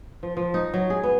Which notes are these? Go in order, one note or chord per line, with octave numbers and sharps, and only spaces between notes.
F3
F3
D#4
F#3
G#4
B3